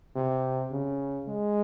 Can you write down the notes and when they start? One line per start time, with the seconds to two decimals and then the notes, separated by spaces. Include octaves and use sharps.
0.16 C3
0.72 C#3
1.28 G#3